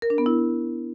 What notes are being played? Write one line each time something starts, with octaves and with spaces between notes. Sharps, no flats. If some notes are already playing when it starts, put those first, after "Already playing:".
A#4
D4
B3
E4